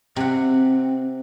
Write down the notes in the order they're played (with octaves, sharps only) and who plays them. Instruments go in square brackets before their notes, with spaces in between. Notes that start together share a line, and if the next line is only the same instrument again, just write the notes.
[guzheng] C3 F#5 [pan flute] C4